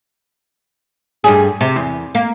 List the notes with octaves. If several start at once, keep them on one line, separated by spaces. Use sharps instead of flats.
G2 G3 G#4
C3
E2
A#3